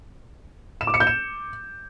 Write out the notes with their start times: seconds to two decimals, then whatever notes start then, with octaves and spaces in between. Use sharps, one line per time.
0.81 E7
0.87 D6
0.94 C#7
1.00 G6
1.07 E7